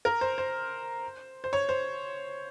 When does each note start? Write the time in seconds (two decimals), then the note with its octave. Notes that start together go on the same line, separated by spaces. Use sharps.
0.05 A#4
0.21 C5
0.38 C5
1.44 C5
1.53 C#5
1.69 C5